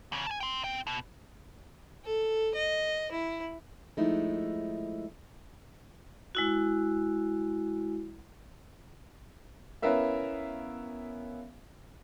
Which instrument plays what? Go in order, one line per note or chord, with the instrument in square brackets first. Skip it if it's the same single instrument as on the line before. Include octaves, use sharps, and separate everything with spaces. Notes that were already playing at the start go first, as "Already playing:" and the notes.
[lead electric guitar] E2 C#3
G#5 A5
G5 C6
C4 G5
B2
[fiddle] A4
D#5
E4
[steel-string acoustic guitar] F3 G#3 A3 D#4 E4
[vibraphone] G#3 E4 F#4
[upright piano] B3 C#4 E4 A#4 E5 F5